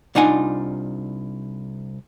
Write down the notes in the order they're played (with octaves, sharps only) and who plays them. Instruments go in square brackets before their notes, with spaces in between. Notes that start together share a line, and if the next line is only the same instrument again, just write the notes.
[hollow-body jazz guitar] C2 D4 D#4 F4 F#5 G#5